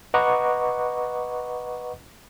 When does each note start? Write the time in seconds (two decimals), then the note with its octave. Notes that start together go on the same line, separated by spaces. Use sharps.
0.14 B4 D#5 F#5 A#5 C#6 D6